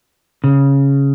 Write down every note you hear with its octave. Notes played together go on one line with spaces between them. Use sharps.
C#3